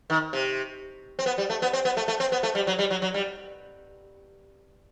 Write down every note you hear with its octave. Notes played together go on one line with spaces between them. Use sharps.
D#3
C3
C4
B3
G3
A3
B3
C4
B3
A3
A3
C4
B3
A3
G3
F#3
G3
F#3
F#3
G3